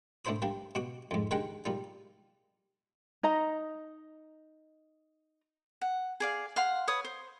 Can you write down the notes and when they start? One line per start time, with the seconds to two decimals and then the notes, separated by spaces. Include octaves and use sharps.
0.25 A2 D4 E4 C5 B5 D#6
0.42 G3 A#3 D4 G4
0.75 B2 F#4 D6
1.11 F2 G#2
1.31 D#3 G#3 D4 G4 F#5 G5
1.65 A#2 G3 D#4
3.23 D#4 D#5 A#5
5.81 F#5
6.20 G#4 D5 F5
6.56 F5 F#5 C6
6.87 B4 C#5 D#6
7.04 C5